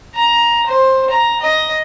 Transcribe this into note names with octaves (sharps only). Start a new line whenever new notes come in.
A#5
C5
A#5
D#5